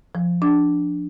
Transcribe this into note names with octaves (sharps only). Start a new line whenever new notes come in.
F3
D4